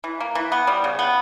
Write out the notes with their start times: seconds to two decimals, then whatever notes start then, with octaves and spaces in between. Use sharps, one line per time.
0.04 E3
0.20 A#3
0.35 E3
0.52 B3
0.67 G3
0.84 C#3
0.99 B3